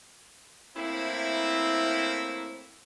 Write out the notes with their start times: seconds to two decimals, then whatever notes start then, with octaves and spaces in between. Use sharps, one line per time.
0.76 A2 A#3 C4 E4